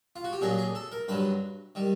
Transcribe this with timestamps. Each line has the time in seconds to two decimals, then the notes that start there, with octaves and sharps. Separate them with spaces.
0.16 F4
0.24 F#4
0.33 G4
0.41 A#2 F#3 A#3 D4 G#4
0.58 G#4
0.75 A4
0.92 A#4
1.08 G2 D3 F#3 B4
1.75 D#3 G3